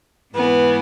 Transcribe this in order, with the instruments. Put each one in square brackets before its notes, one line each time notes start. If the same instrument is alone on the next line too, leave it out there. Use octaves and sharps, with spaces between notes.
[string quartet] G#2 E3 B3